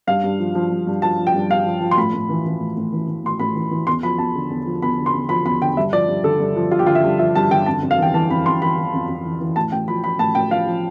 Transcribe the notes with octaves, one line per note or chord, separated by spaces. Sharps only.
G2 F5
G2
F3
F3
G2
G2
F3 A5
F3
G5
G2
G2 F5
F3
F3
C6
A2 B5
A2
E3
E3
A2
A2
E3
E3
A2 C6
A2 B5
E3
E3
E2 C6
F3 B5
E2 A5
D3
E2
F3
E2 B5
D3
C6
E2
F3 B5
E2 B5
D3 G5
G2 E5
F3 D5
G2
D3 A4
G2
F3
G2 F4
G4
D3 F4
E5
G2
F3 E5
G2 A5
D3 G5
F2 A5
F2
F5
E3 G5
E3 A5
F2 B5
F2 C6
E3 B5
E3
F2
F2
E3
E3
A2 A5
A2 G5
F3 B5
F3 B5
A2 A5
A2 G5
F3 F5
F3